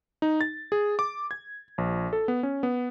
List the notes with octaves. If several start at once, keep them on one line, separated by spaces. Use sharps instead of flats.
D#4
A6
G#4
D6
G#6
A#1
A4
B3
C#4
B3